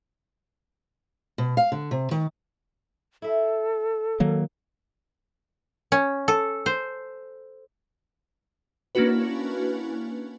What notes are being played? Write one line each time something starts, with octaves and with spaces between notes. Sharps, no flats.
B2
F5
D3
C3
D#3
E4 A4 E5
D#3 F#3 A#3
C#4
A4
C5
A#3 C#4 D4 E4 F#4 B4